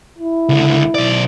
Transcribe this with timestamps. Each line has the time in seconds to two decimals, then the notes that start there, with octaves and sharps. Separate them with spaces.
0.18 E4
0.49 C#2 D3
0.95 B1 D5